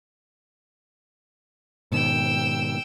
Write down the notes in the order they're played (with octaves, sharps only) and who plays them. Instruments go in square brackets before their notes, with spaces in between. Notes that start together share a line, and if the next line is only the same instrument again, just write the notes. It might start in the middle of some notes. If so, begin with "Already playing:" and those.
[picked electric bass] G#2 B2 D#3 [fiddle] G5 E6